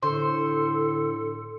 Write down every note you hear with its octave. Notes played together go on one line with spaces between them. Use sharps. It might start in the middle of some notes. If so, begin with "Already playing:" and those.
A2 D3 A4 C5